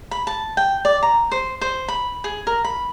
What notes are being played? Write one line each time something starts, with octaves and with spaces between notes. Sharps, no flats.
B5
A5
G5
D5
A#5
C5
C5
B5
G#4
A#4
B5